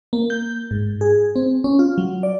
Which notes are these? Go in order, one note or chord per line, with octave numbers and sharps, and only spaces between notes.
A#3
G6
G#2
G#4
C4
C#4
F4
F#3
D5